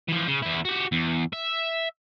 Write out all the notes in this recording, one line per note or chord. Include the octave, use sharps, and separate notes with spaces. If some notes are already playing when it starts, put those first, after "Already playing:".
E3 F3
C#3
E2 E4
F#4 G4
E2
E5